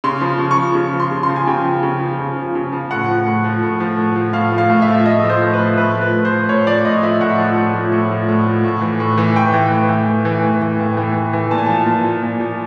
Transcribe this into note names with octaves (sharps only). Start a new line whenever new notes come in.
C#3 C6
F3
C#3
C#6
F3
C#3
F3
C6
C#3
C6
F3
G#5
C#3 G5
F3
C#3
F3
C#3
F3
C#3
F3
A2 F#5
F3
A2
F3
A2
F3
A2
F3
A2 F5
F3
F5
A2
E5
F3
A2 D#5
F3
C5
A2
B4
F3
A2 B4
F3
B4
A2
C5
F3
A2 C#5
F3 D5
A2 D#5
F3 E5
A2 F#5
F3
A2
F3
A2
F3
A2
F3
A2
E3
A2
E3
A2 G5
E3
A2
E3
A2
E3
A2
E3
A2
E3
A2
E3
A#2 A5
G#5
F3 A5
A#2
F3
A#2
F3